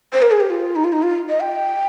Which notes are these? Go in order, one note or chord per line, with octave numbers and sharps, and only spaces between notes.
C5
A#4
G#4
G4
F4
D#4
F4
D#4
F4
D#5
G5